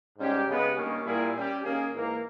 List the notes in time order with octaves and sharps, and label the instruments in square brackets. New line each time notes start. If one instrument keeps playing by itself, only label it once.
[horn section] G#2 G3 C#4 G4
C#3 G#3 B3 G4
G2 D#3 A#3 C#4
A#2 G3 A#3 E4 G#4
G3 C#4 G4
D#3 A#3 C#4 G#4
G#2 E3 A#3